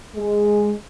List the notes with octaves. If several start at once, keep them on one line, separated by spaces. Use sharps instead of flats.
G#3